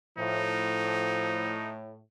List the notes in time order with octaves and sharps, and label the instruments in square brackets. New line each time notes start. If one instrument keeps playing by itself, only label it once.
[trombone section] A2 [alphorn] F3 [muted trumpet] D#4